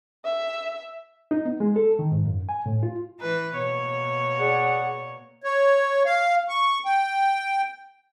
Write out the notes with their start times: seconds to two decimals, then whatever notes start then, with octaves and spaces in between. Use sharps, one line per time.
0.25 E5
1.31 D#4
1.45 B3
1.60 G#3
1.76 A4
1.99 D#3
2.12 G#2
2.25 F#2
2.49 G#5
2.66 A2
2.83 F4
3.20 E3 B4
3.56 B2 A#3 C#5
4.39 G#4 D5 F#5
5.43 C#5
6.06 F5
6.48 C#6
6.85 G5